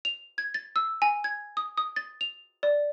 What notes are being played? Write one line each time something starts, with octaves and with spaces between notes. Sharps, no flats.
F7
G#6
A6
E6
G#5
G#6
D#6
D#6
A6
F7
D5